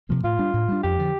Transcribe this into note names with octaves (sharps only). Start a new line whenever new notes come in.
C3 F3 A#3
A2 F4
G3 D4
A2
G3 D4
F2 G4
D3 F3